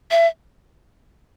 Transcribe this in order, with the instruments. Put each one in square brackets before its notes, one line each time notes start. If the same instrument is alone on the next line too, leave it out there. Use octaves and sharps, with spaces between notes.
[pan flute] E5